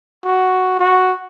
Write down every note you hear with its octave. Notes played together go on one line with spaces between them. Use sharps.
F#4
F#4